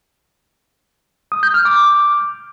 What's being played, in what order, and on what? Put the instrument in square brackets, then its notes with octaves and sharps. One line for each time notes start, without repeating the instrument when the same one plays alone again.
[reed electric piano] D#6
G6
F6
D6